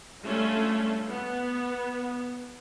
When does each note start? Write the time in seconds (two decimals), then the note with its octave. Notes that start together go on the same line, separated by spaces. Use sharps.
0.25 G3 A3 C#4 D4 F4
1.09 B3